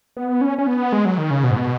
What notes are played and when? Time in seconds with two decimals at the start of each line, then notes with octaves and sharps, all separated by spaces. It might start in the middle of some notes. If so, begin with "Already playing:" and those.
0.17 B3
0.41 C#4
0.58 C#4
0.67 B3
0.92 G#3
1.05 F#3
1.18 D#3
1.31 C#3
1.44 B2
1.51 G#2
1.57 B2